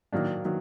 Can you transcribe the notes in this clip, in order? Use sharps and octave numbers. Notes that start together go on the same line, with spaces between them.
D#3 F#3 A#3 D4
D#3 F#3